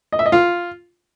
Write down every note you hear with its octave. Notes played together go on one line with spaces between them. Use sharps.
D#5
E5
D#5
F4